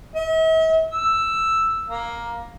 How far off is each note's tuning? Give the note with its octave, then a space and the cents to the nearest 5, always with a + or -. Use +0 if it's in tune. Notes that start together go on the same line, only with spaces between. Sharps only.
E5 -45
E6 +5
A#3 +10